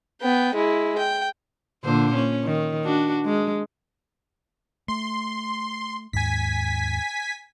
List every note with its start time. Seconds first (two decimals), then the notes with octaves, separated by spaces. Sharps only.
0.21 B3 G5
0.54 G#3 E4
0.98 G5
1.84 A#2 D3 C5
2.14 C#4
2.45 D#3
2.84 D4 F#4
3.25 G#3
4.88 A3 C6
6.13 D#2 G#2 G#5 B6